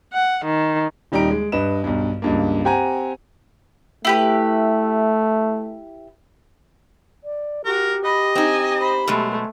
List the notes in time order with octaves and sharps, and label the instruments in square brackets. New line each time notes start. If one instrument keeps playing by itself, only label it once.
[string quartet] F#5
D#3
[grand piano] D#1 G3 D#4 G4 A#5 D7
G#3
G2 B4 D#5 E7
B1 G2
C#2 G2 A#3
C4 G4 F#5 G#5 A#5
[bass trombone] A3 [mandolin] E4 G4 B4
[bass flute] D5
[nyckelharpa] F#4 [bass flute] G4 [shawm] A#4
[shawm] D#5 [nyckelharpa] B5
[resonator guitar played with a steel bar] C4 D#4 [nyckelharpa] G#5
[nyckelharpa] C5 B5
[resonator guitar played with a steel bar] B2 F#3 G#3 [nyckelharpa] A3